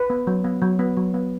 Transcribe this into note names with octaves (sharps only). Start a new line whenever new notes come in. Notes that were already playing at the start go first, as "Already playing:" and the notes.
Already playing: B4
B3
F#3
B3
F#3
B3
F#3
B3